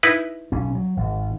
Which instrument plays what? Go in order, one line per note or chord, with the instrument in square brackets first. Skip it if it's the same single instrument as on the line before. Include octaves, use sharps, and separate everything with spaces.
[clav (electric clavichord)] D#4 E4 B4
[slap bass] B1 C#4
F#3
G#1